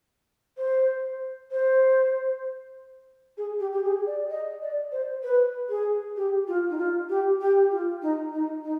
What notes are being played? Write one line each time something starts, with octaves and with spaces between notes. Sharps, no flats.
C5
C5
G#4
G4
G4
G#4
D5
D#5
D5
C5
B4
G#4
G4
F4
D#4
F4
G4
G4
F4
D#4
D#4
D#4